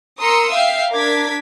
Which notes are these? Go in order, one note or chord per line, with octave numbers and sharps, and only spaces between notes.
A#4 A#5 C6 D#6 E6 C#7
E5 F5 G5 C7
D4 A#4 D6 G#6 B6